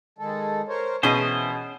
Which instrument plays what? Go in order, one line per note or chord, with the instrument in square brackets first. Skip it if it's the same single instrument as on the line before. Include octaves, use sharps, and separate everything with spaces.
[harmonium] D#3 G#3 A4
A#4 C5 C#5
[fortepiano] B2 [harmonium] E3 [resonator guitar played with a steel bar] C#4 G#4 D#5 [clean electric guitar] C5